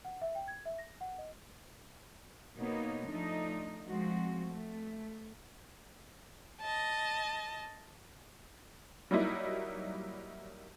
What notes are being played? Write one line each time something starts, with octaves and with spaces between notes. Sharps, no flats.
F#5
E5
G5
G#6
E5
A#6
F#5
D#5
B2 A#3 B3 D#4 C#5
F3 A3 D4 D#4
F3 G#3 C4 F#4
A3
D#5 A5
F#3 G3 A#3 D#4 E4